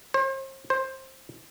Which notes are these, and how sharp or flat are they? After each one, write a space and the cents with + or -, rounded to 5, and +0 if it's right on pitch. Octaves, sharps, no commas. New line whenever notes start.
C5 +40
C5 +15